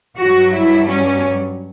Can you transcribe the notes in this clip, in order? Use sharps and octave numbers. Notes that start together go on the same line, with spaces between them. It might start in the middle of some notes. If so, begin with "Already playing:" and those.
G2 F#3 F#4
E4
C#4